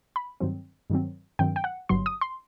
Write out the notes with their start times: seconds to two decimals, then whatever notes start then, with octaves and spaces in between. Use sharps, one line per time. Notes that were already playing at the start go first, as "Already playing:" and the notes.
0.16 B5
0.40 G2 D#3 F#3 C4
0.90 G2 D#3 F#3 C4
1.39 G2 D#3 F#3 C4 G5
1.56 G5
1.64 F#5
1.89 G1 G2 F#3 C6
2.06 D#6
2.21 C6